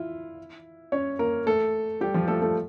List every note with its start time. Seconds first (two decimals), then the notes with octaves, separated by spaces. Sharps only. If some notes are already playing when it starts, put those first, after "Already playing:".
Already playing: E4 F4
0.92 C#4 C#5
1.19 A#3 A#4
1.46 A3 A4
2.01 G3 G4
2.14 F3 F4
2.28 A3 A4
2.42 A3 A4